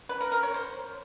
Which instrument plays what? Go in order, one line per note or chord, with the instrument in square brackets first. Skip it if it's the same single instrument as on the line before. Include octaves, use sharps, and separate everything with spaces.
[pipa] B4
A#4
A#4
C#5
C5